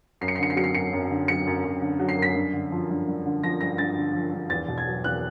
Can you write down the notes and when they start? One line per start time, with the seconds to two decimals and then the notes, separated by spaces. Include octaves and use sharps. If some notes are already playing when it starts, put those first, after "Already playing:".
0.21 F#2 C7
0.28 C#7
0.36 C7
0.39 D3 C#7
0.50 C7
0.56 F#3 C#7
0.64 C7
0.75 F#2 C#7
0.93 F#2
1.10 D3
1.28 F#3 C#7
1.47 F#2
1.65 F#2
1.82 D3
1.99 F#3
2.09 C7
2.18 F#2 B6
2.35 G2
2.53 D3
2.72 F3
2.90 G2
3.08 G2
3.26 D3
3.43 F3 A#6
3.61 G2 A#6
3.78 G2 A6
3.96 D3
4.15 F3
4.33 G2
4.50 E2 A6
4.68 B2
4.78 G#6
4.86 F#3
5.04 E2 F#6